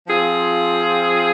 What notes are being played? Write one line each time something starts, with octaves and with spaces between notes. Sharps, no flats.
F3 C4 F4 G#4